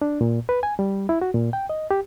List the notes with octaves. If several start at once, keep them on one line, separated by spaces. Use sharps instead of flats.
D4
A#2
B4
G#5
G3
E4
F#4
A#2
G5
D#5
G4